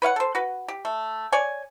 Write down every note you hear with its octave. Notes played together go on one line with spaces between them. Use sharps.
B4 C#5 F5 F#5
A4 C5
F#4 B4
G4
A3
C#5 D5 G#5